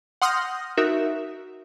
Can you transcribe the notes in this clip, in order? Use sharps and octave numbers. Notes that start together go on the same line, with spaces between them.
F#5 C6 D#6 F6 G6 A#6
D#4 F#4 A#4 E5